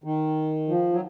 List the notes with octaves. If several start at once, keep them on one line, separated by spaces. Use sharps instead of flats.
D#3
F3
F#3